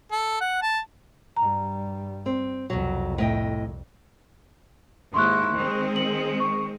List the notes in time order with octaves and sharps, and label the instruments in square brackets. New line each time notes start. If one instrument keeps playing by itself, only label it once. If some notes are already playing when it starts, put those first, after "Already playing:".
[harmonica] A4
F#5
A5
[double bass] G2 G3 [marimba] A#5
[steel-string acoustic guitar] C4
[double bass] C2 F2 [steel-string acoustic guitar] B2 F#3
[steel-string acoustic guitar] A2 D#5 G5
[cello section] D#2 G#2 E4 [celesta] C6 C#6 F#6
[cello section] D#3 G#3 C4
[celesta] F#7
C#6